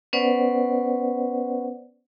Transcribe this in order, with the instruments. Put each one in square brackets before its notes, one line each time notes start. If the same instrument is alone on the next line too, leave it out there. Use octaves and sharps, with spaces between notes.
[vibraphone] B3 C#4 B4 C5 D5 F#5